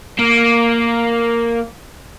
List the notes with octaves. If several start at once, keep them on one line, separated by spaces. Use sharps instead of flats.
A#3